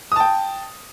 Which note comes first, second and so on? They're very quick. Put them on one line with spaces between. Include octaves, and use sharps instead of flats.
D#6 A5 G5